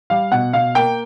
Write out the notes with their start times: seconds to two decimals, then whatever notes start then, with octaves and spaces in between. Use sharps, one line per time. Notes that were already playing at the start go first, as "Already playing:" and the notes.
0.10 G3 F5
0.32 B2 F#5
0.53 B2 F5
0.75 A#3 G5